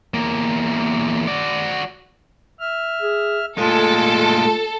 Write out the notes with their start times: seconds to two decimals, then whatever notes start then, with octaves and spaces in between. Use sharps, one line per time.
0.14 E2 A#3
1.27 F#4 D5
2.60 E5 F6
3.02 G#4
3.58 A#2 G#3 A3 F4 A4